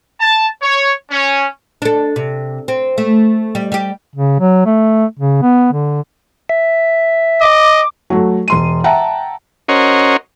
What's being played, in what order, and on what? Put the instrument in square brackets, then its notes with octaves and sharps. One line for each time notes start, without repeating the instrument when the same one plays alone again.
[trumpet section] A5
C#5
C#4
[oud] D4 A4
C3
C4
A3
G3
G3 G4
[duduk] C#3
F#3
A3
C#3
B3
D3
[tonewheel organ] E5
[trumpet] D#5 [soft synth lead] D6
[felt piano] F#3 A3
E1 C6 D#7
E5 F#5 G5 A5 A#5
[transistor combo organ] C#4 F#4 A#4 C5 C#5 D#5